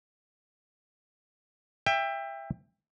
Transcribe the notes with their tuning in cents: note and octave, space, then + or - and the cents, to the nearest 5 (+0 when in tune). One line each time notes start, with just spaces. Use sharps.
E5 +10 G5 +25